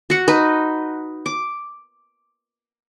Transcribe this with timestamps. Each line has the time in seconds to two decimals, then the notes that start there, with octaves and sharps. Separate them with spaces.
0.10 F#4 F#5
0.28 D#4 B4
1.26 D6